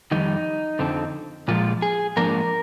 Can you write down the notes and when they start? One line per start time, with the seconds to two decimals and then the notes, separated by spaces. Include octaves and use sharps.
0.11 F2 D#3 G3 D#4
0.79 F2 D3 F3 C4
1.48 A#2 F3 G#3 F4
1.82 G#4
2.17 G#2 F3 A#3 D4 A#4